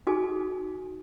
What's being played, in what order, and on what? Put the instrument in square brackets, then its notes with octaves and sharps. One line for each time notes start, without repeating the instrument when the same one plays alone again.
[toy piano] D#4 F#4 G#4 A4 G#5